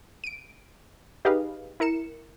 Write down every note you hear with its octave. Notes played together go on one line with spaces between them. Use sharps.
D7 D#7
D#4 G4 G#4 B4 D#5 F5
E4 A#4 C#7 E7